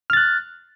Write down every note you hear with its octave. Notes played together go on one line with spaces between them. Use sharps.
F6 F#6 A6